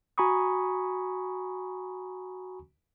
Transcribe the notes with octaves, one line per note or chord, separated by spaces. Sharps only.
F#4 G#5 A#5 B5 C#6 D#6